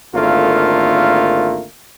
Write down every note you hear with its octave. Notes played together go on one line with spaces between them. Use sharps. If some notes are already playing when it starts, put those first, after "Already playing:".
G#1 D3 A3 A#3 F4